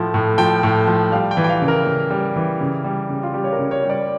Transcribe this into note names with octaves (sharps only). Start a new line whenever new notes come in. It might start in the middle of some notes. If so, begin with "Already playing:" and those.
Already playing: A2 F3
A2
F3 G5
A2
F3
G3 F5
G5
E3
G5
F5
C#3
A#4
C#3
G3
E3
C#3
G3
C#3
F4
G3 G4
C#5
A#4
C#3
C#5
G3
D5